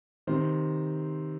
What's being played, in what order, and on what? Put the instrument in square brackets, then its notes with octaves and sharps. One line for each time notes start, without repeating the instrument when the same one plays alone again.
[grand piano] C3 D#3 C5